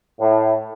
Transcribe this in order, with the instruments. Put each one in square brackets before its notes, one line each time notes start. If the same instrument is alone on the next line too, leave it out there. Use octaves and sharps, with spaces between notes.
[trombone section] A2